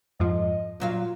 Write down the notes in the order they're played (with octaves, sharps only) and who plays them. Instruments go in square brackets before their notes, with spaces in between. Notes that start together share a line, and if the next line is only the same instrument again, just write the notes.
[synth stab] F2 G#2 F3 [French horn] D#5
[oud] A#2 F#3 F5 [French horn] F4